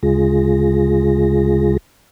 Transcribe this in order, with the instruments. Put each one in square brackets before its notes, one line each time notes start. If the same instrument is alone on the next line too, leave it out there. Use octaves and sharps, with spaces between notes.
[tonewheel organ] D2 C#3 G#3 F4 G#4 A#6